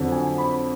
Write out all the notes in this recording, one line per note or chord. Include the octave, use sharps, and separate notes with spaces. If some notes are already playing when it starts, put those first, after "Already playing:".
Already playing: F2 D3 F#3
G#5
B5